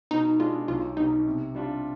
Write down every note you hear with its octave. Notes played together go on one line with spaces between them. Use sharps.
B2 D#4
G#3 D4 F4
B1 F4
B2 G3 D#4
C3
G3 D4 F4